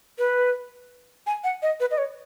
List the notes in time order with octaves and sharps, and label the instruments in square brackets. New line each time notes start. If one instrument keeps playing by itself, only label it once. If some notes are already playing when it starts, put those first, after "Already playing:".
[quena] B4
G#5
F#5
D#5
B4
D#5
C#5